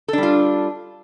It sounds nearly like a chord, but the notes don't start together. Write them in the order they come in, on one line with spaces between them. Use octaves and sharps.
A4 D4 G3 F4